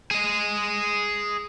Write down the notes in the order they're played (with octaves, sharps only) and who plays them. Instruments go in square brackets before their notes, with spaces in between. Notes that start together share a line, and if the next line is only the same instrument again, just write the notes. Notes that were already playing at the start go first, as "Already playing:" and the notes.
[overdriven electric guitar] G#4 D#5